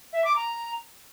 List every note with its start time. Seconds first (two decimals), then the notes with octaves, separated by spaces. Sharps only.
0.13 E5
0.24 D6
0.36 A#5